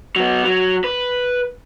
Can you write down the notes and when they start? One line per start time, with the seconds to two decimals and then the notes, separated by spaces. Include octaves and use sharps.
0.16 F#3 B3
0.44 F#3
0.84 B4